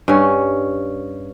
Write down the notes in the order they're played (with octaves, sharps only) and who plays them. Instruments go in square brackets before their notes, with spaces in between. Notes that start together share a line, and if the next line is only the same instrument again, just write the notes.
[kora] G2 C#4